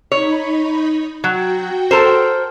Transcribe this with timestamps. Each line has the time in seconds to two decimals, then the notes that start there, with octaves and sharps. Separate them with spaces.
0.12 D#4 C#5 B5
1.24 F#3 F#4 G5
1.91 A4 A#4 C5